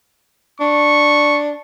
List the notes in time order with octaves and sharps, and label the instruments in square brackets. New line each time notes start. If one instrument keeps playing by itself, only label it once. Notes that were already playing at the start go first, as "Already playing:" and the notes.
[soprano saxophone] D4 [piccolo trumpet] C#6